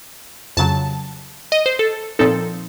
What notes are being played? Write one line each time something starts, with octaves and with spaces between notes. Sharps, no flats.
F2 C#3 F#3 A5
D#5
C5
A4
A#2 F3 C4 D#4 A4